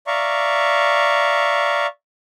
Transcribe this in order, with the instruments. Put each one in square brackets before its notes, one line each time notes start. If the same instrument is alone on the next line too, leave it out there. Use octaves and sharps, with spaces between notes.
[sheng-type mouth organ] D5 E5 F5 A#5 C#6